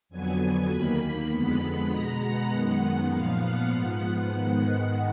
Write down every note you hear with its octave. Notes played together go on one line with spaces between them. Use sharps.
F2 D3 F#3 B3 G#5
D#2 D#3 A#3 B5
F2 D3 G#3 B3
B2 G#3 B3 A#5
F#5
F#2 D#3 G#3 B3
A#2 F3 B3 F5
F#5
G#2 F3 B3
G#2 D#3 G#3 B3